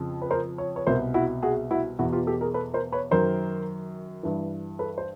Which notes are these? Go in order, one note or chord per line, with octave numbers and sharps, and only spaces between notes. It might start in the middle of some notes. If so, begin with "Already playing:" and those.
Already playing: F2 C#3 F3
B4
A#4 C5
C#5
B4 C#5
C2 B2 A#4 C5
E4 F#4
F#4 G#4
E4 F#4
E2 B2 E4 F#4
F4 G4
G4 A4
G#4 A#4
A4 B4
A#4 C5
B4 C#5
F#2 D#3 A#4 C5
G2 E3
A4 B4
C5